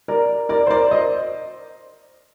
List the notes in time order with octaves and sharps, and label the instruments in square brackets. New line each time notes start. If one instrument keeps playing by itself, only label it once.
[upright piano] A#4 D5
A#4 D5
C5
A#4 D5
C5 D#5